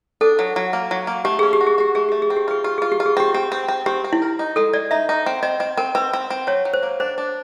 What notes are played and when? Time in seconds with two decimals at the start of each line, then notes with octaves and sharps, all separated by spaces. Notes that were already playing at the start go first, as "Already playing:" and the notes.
0.21 D4 A4
0.39 F#3
0.56 F#3
0.73 A#3
0.91 F#3
1.07 A#3
1.25 A3 G4
1.39 C#4 G#4
1.53 G4
1.61 F#4
1.67 G#4
1.78 F#4 G4
1.95 A3 G#4
2.09 A3 G4
2.22 G#4
2.30 C4
2.37 G4
2.48 F4 G#4
2.64 F4 G4
2.78 F4 G#4
2.92 G4
3.00 F4
3.06 G#4
3.17 C4 G4
3.34 C4 G4
3.52 C4
3.68 C4
3.86 C4 G4
4.04 C4
4.13 E4
4.22 A#4
4.39 D#4
4.56 G#3 A4
4.73 G#3 D5
4.91 D#4 E5
5.09 D#4
5.26 C4
5.43 C4 D#5
5.60 C4 D#5
5.77 C4 A#4
5.95 C4 B4
6.13 C4
6.30 C4
6.47 F#3 C#5
6.65 F#3
6.74 C5
6.83 A#3
7.00 D4 C5
7.18 D4